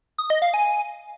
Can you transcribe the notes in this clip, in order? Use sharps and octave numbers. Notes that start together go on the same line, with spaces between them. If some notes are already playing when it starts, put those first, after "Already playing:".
D#6
D#5
F5
G#5